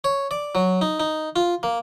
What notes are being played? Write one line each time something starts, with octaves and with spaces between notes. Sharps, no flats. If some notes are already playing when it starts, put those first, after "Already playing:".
C#5
D5
F#3
D#4
D#4
F4
A#3